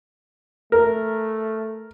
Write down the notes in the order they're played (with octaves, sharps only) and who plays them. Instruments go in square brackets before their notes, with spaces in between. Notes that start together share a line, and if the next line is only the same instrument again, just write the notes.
[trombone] A3 [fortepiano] A#4